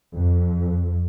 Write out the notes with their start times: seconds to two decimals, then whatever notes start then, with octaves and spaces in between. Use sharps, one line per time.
0.13 F2